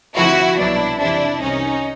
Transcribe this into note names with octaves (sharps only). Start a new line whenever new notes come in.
D2 C3 F3 E4 F#4
C2 B2 F#3 D4 E4
F2 C3 E3 D4 E4
C2 C3 D#3 C#4 D#4